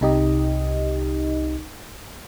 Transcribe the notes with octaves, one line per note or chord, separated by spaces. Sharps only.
C2 C3 D#4 G4 D#5